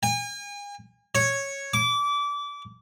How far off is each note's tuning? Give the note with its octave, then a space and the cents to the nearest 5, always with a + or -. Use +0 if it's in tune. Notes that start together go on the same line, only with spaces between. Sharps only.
G#5 -40
C#5 -5
D6 -25